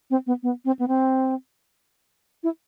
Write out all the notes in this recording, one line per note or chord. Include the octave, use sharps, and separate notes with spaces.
C4
B3
B3
C4
B3
C4
E4